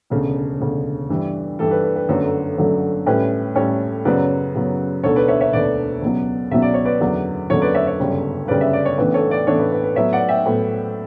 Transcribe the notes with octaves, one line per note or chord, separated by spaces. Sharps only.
E1 D2 C#3
E1 D2 C#3
G2 E3 G3
G2 E3 G3 A4
B4
B4
B4
G1 F#2 D3 F#3 A3
G1 F#2 D3 F#3 A3
A2 G3 C#4 E4 B4
A2 G3 C#4 E4 A4 C#5
F#2 C#3 F#3 B3 B4 D5
F#2 C#3 F#3 B3
E1 D2 D3 A4 C#5
B4 D5
C#5 E5
C#5 E5
E1 D2 D3 B4 D5
C#2 B2 F#3
C#2 B2 F#3 E5
D5
C#5
B4 D5
F#1 E2 D3 F#3
F#1 E2 D3 F#3 A4 C#5
B4 D5
C#5 E5
C#5 E5
G1 F#2 C#3 G3
G1 F#2 C#3 G3 B4 D5
E5
D5
C#5
A1 A2 E3 B3 D4 B4
A4 C#5
B4 D5
A1 A2 E3 B3 D4 A4 C#5
B4
B4
B4
A2 F#3 B3 C#5 E5
D5 F#5
E5 G5
A2 F#3 B3